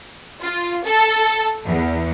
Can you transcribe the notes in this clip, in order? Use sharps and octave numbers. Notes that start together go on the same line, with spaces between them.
F4
A4
E2